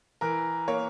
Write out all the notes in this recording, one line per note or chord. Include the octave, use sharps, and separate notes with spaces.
E3 A#4
A#3 C#5